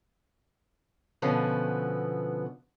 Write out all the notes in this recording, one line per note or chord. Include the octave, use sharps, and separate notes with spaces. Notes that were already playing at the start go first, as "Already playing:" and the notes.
B2 D3 F3 B3 C#4